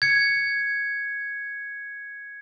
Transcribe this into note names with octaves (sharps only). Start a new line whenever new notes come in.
G#6 C#7